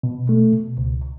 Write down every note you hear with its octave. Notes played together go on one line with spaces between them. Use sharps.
B2
A3
B2
C#2